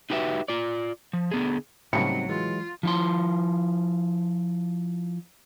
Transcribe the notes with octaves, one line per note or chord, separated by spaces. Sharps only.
D#4 F#4 G4 B4 E5
F4 D5
F3
D3 B3 G#4
A2 C#3 F#3 G3 A#3 C4 D#4 C#7
E3 F#3 G#3 F4
F3 E4 C6